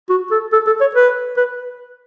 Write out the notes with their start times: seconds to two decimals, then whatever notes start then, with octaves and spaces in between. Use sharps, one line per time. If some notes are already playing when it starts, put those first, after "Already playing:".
0.10 F#4
0.31 A4
0.53 A4
0.67 A4
0.81 C#5
0.95 B4
1.37 B4